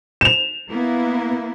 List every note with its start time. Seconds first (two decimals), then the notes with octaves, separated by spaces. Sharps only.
0.21 E7 F7
0.68 A#3 B3 E4